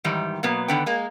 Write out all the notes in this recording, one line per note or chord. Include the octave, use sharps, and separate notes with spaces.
G#2 D#3 E3 G3
B2 F#3 A#3 B3
D3 D#3 B3 B4 G5
G#3 A#3